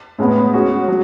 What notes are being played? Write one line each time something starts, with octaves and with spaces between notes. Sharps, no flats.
A2 G#3 B3
G#3 C#4 F#4
F#3